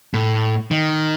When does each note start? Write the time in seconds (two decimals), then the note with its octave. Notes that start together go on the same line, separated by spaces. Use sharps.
0.14 A2
0.71 D#3